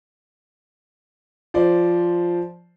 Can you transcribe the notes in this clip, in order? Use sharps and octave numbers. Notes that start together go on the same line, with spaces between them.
F3 C5 D5